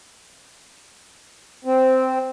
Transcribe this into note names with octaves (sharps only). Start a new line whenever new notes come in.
C4